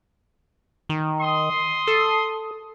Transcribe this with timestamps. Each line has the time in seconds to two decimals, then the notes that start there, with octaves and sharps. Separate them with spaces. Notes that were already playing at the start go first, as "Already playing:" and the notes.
0.89 D#3
1.21 C6 D#6
1.87 A4